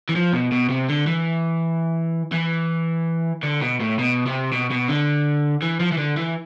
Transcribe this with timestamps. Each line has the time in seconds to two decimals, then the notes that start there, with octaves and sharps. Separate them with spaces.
0.09 E3
0.16 F3
0.33 B2
0.52 B2
0.69 C3
0.88 D3
1.07 E3
2.33 E3
3.43 D3
3.61 B2
3.80 A2
3.98 B2
4.26 C3
4.52 B2
4.70 B2
4.89 D3
5.62 E3
5.80 F3
5.92 E3
5.98 D3
6.17 E3